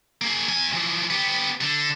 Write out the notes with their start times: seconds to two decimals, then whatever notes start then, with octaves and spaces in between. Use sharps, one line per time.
0.21 A#3 G#4
0.48 E2 G#5
0.73 E3 F3
1.10 B3 G4
1.62 D3